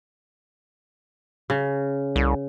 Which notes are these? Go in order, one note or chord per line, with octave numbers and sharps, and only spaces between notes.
C#3
C2